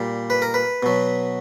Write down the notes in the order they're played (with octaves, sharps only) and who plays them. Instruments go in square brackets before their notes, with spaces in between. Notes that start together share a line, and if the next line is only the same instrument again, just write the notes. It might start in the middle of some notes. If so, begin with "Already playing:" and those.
Already playing: [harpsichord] A#2 G3
B4
A#4
B4
B2 F#3